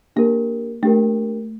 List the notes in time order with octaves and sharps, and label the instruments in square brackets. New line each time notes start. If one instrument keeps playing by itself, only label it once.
[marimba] A#3 [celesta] D4 G4 A#4
[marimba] A3 [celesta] D4 G4 A#4